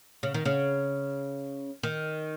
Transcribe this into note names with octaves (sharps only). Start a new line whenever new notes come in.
C#3
D#3
C#3
D#3